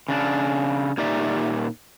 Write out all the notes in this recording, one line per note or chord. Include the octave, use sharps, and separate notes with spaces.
C#3 D4
A#2 D#4 G4 D5 E5